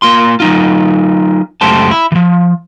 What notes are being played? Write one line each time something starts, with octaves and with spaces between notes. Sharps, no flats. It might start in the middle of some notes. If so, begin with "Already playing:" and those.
A#3 F4 C6
F#3 D#4 F4
C#2 F#2 A3 G4 C5 A5
E4
E3 F3